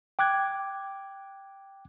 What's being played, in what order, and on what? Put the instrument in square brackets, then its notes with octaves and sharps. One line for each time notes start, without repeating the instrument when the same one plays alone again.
[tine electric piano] G5 D6 F#6 G#6